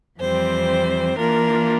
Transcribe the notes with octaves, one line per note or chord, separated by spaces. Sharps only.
F2 E3 G3 C4 C5
E3 A#3 D4 F4 A#4